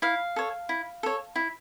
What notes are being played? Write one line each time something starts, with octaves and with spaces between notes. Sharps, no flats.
E4 F5
A4 C#5
E4
A4 C#5
E4